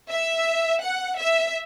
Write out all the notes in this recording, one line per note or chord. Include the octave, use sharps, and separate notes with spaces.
E5
F#5
E5